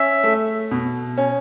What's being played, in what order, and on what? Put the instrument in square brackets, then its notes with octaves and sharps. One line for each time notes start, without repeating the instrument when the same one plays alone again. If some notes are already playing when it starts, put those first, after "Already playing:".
Already playing: [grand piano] C#4 [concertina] E5
[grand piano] A3
B2
C#4